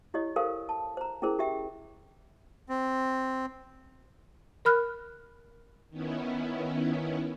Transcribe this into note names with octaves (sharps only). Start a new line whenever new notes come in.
E4 G4 C#5 D#5
G4 A4 A#4 C5 F5 G#5
A5
C5 A#5
C#4 E4 G#4 A#4 C5
G4 E5 G5
C4
A#4 B5 F6 F#6
D#3 B3 C#4 E4